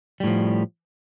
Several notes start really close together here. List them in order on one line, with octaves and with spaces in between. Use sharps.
G3 A2 F3